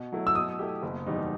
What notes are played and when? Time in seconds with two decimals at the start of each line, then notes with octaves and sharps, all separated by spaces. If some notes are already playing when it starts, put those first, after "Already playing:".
Already playing: B2
0.12 F#3 A3 E4
0.27 E6
0.35 B2 D#6
0.59 A3 E4 G4
0.83 F#1
1.07 E2 B2 G3 D#4